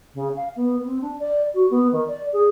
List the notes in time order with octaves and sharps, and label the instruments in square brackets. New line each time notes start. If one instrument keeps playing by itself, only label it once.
[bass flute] C#3
F5
B3
C4
D4
D5
F#4
B3
D#3
D5
G#4